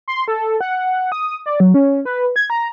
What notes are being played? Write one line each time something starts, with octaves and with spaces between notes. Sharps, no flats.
C6
A4
F#5
D#6
D5
F#3
C#4
B4
G#6
A#5